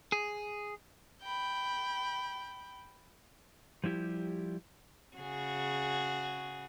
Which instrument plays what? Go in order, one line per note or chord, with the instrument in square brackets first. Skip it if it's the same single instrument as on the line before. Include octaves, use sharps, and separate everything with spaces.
[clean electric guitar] G#4
[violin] G5 B5
[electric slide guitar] F3 G3 E4 G4
[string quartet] C#3 F#4 G#4